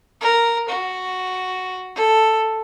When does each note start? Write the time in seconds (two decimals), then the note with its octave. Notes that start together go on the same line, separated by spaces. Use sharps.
0.21 A#4
0.69 F#4
1.96 A4